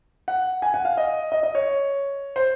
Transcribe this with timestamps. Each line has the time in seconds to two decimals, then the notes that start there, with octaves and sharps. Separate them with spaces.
0.28 F#5
0.62 G#5
0.74 F#5
0.85 F5
0.97 D#5
1.32 D#5
1.43 D#5
1.55 C#5
2.36 C5